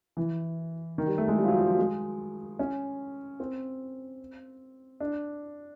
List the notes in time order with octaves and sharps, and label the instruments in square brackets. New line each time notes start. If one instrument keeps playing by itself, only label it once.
[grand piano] E3
D#3
G3
A3
G#3
G3
F3
F#3
F3
F#3
G#3
C#4
C4
D4